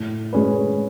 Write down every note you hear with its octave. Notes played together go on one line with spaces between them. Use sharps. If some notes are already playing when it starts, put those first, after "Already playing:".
Already playing: A2
G#3 C#4 G#4 B4